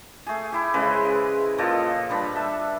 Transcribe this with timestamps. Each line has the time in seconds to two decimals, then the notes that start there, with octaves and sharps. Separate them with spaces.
0.27 A3 G#4
0.52 E4 G4
0.74 C#3 G#3 B4 C5
1.58 A#2 F3 A4 D#5
2.10 G3 D4 B4
2.35 A4 E5 A5